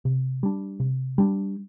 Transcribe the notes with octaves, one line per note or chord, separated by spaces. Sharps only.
C3
G3 D4
C3
G3 D4